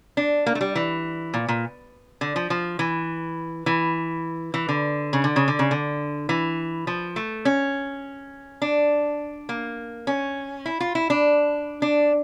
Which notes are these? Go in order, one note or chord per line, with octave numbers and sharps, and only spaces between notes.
D4
A#3
A3
G3
E3
A#2
A#2
D3
F3
F3
E3
E3
E3
D3
C#3
D3
C#3
D3
C#3
D3
E3
F3
A3
C#4
D4
A#3
C#4
E4
F4
E4
D4
D4